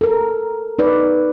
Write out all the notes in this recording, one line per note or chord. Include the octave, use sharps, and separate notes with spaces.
A4 A#4
D#4 B4 D5